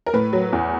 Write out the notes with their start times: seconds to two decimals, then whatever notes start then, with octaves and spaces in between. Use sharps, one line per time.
0.06 A#4
0.13 A2 B4
0.33 F#3
0.53 E2